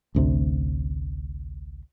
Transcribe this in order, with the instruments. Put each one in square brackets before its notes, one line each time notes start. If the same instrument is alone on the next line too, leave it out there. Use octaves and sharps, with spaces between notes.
[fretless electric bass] A1 D2 C3